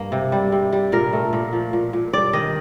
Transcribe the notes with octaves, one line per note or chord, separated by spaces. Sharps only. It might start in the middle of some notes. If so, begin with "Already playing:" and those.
Already playing: G2 A#3
C3
G3
C3
G3
A#2 A#4
A3
A#2
F3
A#2
A#2
G2 D5
D#3 D#5